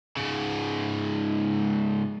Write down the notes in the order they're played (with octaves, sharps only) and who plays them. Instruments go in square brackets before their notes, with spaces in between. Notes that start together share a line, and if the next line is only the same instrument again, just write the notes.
[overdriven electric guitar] G#2 C#3